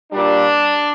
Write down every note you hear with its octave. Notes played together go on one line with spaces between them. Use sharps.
A#2 G3 D4